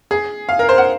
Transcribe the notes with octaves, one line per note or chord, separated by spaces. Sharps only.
G#4
F5
A#4
C5
F#5